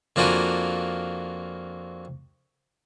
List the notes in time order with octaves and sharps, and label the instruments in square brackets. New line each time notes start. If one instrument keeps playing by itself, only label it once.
[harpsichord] F2 A#3 D4 F4 F#4 G#5